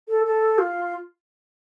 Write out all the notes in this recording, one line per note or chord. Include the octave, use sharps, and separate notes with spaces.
A4
A4
F4